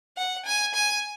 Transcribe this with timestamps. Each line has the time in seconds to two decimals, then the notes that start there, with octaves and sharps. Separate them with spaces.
0.17 F#5
0.46 G#5
0.74 G#5